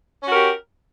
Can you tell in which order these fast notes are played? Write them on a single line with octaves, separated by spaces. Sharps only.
C#4 F#4 A#4 G4